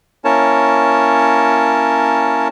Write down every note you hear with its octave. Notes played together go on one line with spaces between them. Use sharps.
A#3 C#4 E4 A#4 C#5 A5